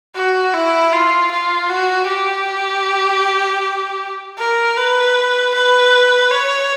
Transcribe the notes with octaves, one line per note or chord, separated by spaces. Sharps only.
F#4
E4
F4
F4
F#4
G4
A#4
B4
B4
C#5